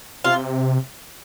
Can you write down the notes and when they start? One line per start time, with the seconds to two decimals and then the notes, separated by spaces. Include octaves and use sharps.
0.24 C3 F4